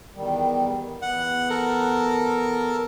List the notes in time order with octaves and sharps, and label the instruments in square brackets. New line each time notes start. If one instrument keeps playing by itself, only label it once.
[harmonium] E2 D#3 G3
[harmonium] E2 B3 [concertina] F#5
[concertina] A4 A#4